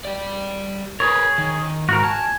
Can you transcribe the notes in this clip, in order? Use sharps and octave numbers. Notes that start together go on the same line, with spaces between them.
G4 D5
G#4 A#4 B4 C#5
D#3
G#2 F#4 A#4
G#5 A5